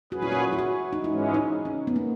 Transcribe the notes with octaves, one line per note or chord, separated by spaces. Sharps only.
A#2 F#3 C#4 F#4 G#4 B4
E4
F#4
E4
F#4
D#4
G#2 E3 G#3 C#4 E4
D#4
C#4
B3
A#3